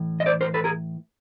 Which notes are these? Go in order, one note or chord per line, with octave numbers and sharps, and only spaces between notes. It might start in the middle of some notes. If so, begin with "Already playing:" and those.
Already playing: A2 E3
D#5
C5 D5
A#4 C5
A4 B4
G#4 A#4